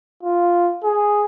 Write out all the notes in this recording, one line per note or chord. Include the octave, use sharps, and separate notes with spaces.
F4
G#4